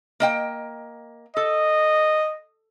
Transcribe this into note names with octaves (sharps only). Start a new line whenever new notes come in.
A#3 D#5 G5
A4 D#5